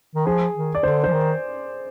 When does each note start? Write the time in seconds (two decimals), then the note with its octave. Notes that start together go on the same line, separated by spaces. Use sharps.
0.15 D#3
0.26 F3 G#4
0.55 D#3
0.75 D5
0.83 D3 C5
1.04 F3 C5
1.12 D#3